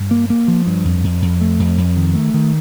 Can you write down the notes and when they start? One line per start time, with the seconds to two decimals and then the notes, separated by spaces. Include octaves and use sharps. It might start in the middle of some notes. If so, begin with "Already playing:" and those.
Already playing: G2
0.11 A#3
0.30 A#3
0.48 F3
0.67 G2
0.85 F2
1.04 F2
1.22 F2
1.41 A3
1.60 F2
1.78 F2
1.96 D#3
2.15 A3
2.34 D#3